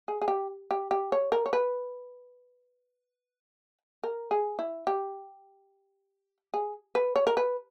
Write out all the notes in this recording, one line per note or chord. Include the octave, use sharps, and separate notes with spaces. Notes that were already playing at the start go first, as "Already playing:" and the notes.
G#4
G#4
G4
G4
G4
C#5
A#4
C#5
B4
A#4
G#4
E4
G4
G#4
B4
C#5
A#4
B4